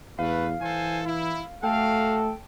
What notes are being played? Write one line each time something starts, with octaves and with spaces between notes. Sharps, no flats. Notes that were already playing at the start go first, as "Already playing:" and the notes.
E2 A3 B4 F5
E3 A4 C5 G#5
E4
A3 F#4 A4 F5 G5 A5